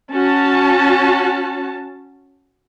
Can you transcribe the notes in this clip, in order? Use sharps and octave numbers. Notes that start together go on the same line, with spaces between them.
C#4 F#4 A5